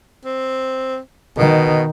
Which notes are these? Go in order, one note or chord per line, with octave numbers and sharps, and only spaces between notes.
C4
B2 D#3